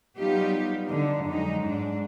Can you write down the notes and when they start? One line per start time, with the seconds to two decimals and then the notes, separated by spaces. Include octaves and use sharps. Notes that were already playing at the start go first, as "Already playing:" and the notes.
0.18 F#3 G3 B3 D#4 F4 G4
0.84 D3 D4 D#4
1.26 F2 F#3 G#3 D#4
1.63 G#2 D4